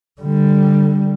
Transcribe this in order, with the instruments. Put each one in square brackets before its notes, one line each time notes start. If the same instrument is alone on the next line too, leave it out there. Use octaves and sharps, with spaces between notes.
[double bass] D3 G3